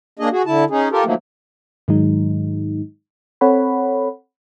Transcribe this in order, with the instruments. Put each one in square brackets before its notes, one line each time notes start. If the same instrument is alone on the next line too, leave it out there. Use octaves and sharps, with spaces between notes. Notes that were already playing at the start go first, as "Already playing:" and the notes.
[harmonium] A#3 D4 G#4 D#5
F#4 G#4
D3 E4 A5
C#4 D#4 G#4
F4 G4 A4 A#4
D#3 F3 F#3 A3 A#3
[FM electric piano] G#2 D#3 F#3 G#3 D#4
C4 A4 C#5 F#5 B5